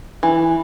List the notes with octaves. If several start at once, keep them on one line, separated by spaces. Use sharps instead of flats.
E3